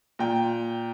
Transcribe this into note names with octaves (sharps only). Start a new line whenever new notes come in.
A#2 G5